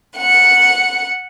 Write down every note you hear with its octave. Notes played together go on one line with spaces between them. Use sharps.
F#5